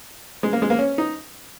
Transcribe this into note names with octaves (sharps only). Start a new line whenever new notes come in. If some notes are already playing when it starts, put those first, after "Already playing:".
G#3
A#3
G#3
A#3
C#4
D#4